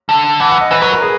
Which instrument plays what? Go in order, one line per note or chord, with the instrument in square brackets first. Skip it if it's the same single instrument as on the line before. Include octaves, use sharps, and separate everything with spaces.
[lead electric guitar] D3
[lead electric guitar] E3 [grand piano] F#5
[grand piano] F#5
D#5
[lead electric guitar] E3 [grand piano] B4
[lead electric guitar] F#3 [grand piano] B4
[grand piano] A#4
G#4